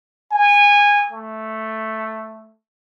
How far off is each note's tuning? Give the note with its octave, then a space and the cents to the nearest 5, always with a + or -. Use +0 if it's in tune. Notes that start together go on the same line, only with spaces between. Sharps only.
G#5 -20
A3 +0